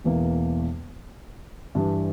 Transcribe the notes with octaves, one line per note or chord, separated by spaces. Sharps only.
E1 E2 E3 A#3
G2 E3 G3 D4